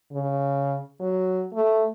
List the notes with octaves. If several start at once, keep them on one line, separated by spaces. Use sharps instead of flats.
C#3
F#3
A3